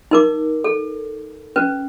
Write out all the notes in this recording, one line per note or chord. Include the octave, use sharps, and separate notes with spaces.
D#4 A#4 D6
A4
C#4 B4